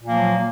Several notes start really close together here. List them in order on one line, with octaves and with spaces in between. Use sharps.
A#2 A#3 F3 F#3